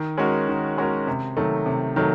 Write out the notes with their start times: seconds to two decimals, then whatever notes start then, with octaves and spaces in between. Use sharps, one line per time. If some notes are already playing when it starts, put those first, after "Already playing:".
Already playing: D#3
0.18 G#3 C#4 F#4 A#4
0.48 D#3
0.77 G#3 C#4 F#4 A#4
1.07 C3
1.37 D#3 F#3 A3
1.66 C3
1.96 D#3 F#3 A3